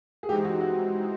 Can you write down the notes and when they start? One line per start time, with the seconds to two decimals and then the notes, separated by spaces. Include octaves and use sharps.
0.23 G#4
0.29 E3 G#3 C4 D#4 G4
0.45 F#4
0.61 F#4